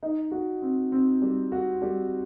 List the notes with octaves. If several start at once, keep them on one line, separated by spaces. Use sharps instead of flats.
D#4
F#4
C4
C4
G3
F#4
G3